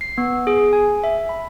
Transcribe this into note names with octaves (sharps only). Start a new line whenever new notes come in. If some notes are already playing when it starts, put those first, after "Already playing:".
C7
B3
G#4
G#5
E5
B5